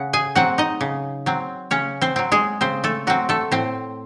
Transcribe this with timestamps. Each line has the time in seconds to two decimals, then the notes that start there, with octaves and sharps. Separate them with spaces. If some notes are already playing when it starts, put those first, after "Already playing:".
Already playing: C#3 F#5
0.13 G#4 G#5
0.35 F#3 C4 F#4 F#5
0.58 D#4 D#5
0.81 C#3
1.26 F#3 C4
1.71 C#3 C#4 C#5
2.02 C4 C5
2.16 F#3 C4
2.32 G#3 G#4
2.61 C#3 C4 C5
2.84 A3 A4
3.07 F#3 C4 F#4
3.29 A3 A4
3.51 A2 C4 C5